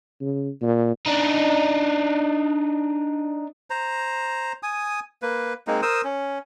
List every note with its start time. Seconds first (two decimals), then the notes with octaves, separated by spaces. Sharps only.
0.21 C#3
0.62 A#2
1.06 D4 D#4
3.70 C5 A#5
4.63 G#5 D#6
5.22 A#3 B4
5.67 G#3 A#3 C4 D#4
5.82 A#4 C5 D#6 E6
6.04 C#4